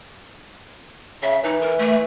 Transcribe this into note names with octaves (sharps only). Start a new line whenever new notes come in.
C#3 E5
E3 D#4
A#4
A3